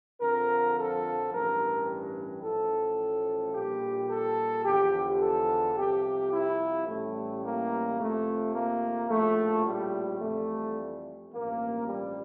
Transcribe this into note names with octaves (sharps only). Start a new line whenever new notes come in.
F2 D3 F3 A#4
A4
A1 G2 E3 G3 A#4
A1 A2 F3 A4
A#1 A#2 G3 G4
A4
E2 D3 F3 G4
A4
C2 C3 F3 G4
E4
A1 A2 E3 G3 A3
A#3
F2 C3 F3 A3
A#3
A#1 A2 F3 A3
G3
F2 E3 G3 A3
A1 G2 F3 A#3
G3